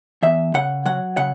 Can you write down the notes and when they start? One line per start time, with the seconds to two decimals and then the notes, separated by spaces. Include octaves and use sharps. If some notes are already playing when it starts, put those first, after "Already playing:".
0.23 E2 E5
0.54 C#3 F#5
0.86 F#3 F#5
1.17 C#3 F#5